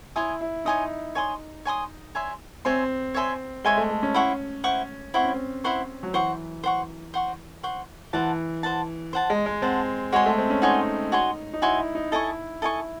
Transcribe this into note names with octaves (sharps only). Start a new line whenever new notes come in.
E4 C#5 G#5 C6 D#6
E4
D#4 C#5 G#5 C6 D#6
C#5 G#5 C6 D#6
C#5 G#5 C6 D#6
C#5 E5 G#5 C6
C4 C#5 E5 G#5 C6
C#5 E5 G#5 C6
G#3 C#5 E5 G#5 C6
A3
A3
C#4
E4 C5 F#5 C#6
E4 C5 F#5 C#6
C4 E4 C5 F#5 C#6
C#4
C4
E4 C5 F#5 C#6
F#3
E3 C5 F#5 C#6
C5 F#5 C#6
C5 F#5 C#6
C5 F#5 C#6
E3 C5 F#5 A5
C5 F#5 A5
C5 F#5 A5
G#3
G#3
C4 C5 F#5 A5
G#3 F#4 C#5 G#5 C6
A3
C4
C#4
D#4 F#4 C#5 G#5 C6
F#4 C#5 G#5 C6
D#4
E4 F#4 C#5 G#5 C6
E4
D#4
E4 A4 D#5 G#5 C#6
E4 A4 D#5 G#5 C#6